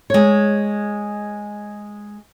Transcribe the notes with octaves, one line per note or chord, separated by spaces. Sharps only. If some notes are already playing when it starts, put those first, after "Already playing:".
G#3 C#5